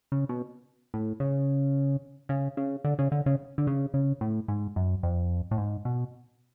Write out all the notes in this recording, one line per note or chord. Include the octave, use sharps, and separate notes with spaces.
C#3
B2
A2
C#3
C#3
C#3
D3
C#3
D3
C#3
D3
C#3
C#3
A2
G#2
F#2
F2
A2
G#2
B2